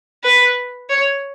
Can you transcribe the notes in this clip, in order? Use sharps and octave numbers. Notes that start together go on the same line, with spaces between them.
B4
C#5